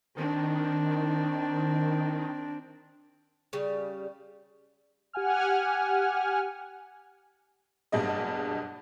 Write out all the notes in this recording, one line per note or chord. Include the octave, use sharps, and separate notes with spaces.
D#3 C4 D4
C#3 G3
G4 F#5 G#5 F6
F#1 G2 B2 D4 G#4 D#5